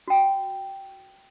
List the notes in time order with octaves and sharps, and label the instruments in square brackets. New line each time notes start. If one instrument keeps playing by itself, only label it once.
[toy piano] F#4 G5